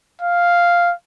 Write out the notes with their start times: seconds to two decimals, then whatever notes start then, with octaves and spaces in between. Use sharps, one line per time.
0.22 F5